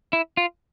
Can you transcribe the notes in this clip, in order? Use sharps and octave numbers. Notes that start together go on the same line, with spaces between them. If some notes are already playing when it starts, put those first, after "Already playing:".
E4
F4